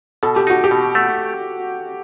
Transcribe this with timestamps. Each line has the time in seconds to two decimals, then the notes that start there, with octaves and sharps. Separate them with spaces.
0.23 B2 A4
0.36 G4
0.47 D#4 F#4
0.64 G4
0.71 B2
0.95 A3